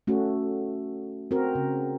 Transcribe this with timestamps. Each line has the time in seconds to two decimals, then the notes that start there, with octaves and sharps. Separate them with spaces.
0.07 A3 C#4 F#4
1.31 C4 F#4 A#4
1.55 C#3